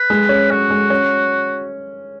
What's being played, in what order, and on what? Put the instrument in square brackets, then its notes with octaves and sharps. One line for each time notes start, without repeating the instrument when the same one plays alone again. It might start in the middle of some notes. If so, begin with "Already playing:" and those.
Already playing: [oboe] B4
[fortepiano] G#3
C#4
[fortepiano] C#4 [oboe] F#4
[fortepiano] G#3
C#4